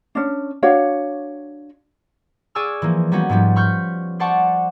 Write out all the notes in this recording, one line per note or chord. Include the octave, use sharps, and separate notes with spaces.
C#4 D4
D4 F#4 C#5 F5
G#4 D5 G#5 C#6 E6 F6
E3 F3 A#3
G3 A#3 B3 C#4 F#4
G#2 F3 G3 B3
B5 C#6 F6 G6
C5 D5 F#5 A5 C#6